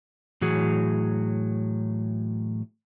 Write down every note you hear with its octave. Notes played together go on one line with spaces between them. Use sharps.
A2 E3 F#3 F#4 G#4